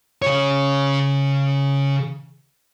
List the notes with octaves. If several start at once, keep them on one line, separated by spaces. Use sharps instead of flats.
C#3 C#5